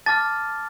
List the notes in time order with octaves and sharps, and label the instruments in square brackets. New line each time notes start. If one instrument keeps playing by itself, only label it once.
[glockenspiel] A5 D6 F6 A6